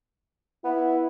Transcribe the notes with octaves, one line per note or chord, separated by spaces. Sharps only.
B3 E4